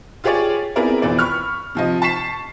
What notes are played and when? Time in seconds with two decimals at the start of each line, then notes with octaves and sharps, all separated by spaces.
0.24 F4 G4 G#4 C#5 D5
0.76 B3 C4 E4 G#4 A#4 D5
1.02 F2 B2 E3 C4 D5
1.19 B5 C#6 F6
1.75 C3 F3 D#5
2.02 A5 C#6 B6 C7 E7